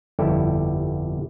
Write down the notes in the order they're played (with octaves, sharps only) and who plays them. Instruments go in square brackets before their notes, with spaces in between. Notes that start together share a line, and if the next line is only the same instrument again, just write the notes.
[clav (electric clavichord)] G1 F2 G3 E4 G4 A4